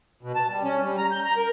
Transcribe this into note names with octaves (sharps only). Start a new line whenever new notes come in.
B2
A5
G3
C#4
G3
A#5
G6
A#5
A#4